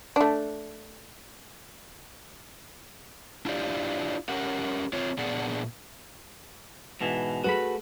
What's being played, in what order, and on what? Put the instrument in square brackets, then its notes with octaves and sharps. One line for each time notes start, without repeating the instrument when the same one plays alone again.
[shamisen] A3 D4
[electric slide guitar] D4 E4 F4 G4 D5
C#4 G4 A#4 F#5
C4 F4 C#5
A#2 B3 D4 G#4 D5 F#5
[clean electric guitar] G#2 B2 E3
[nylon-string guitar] A3 G#4 B4 [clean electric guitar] F#4 B5